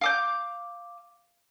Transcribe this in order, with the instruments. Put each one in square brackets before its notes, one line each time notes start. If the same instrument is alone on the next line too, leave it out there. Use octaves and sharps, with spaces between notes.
[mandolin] F5 D6 G6